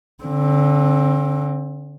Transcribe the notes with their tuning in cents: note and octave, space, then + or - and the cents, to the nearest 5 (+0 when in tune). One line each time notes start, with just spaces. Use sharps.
D3 -20 C4 +25